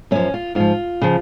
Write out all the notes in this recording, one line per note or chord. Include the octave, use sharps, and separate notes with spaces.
F#2 F3 C#4
F4
G#2 F3 F4
C#3 F3